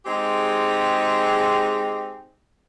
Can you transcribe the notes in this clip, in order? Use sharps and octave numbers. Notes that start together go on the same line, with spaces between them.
G#3 C4 D#4 G4 G#4